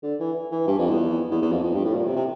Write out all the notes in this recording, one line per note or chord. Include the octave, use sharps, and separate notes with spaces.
D3
E3
E3
G2
F2
E2
E2
E2
F2
F2
G2
A2
A#2
C3
C3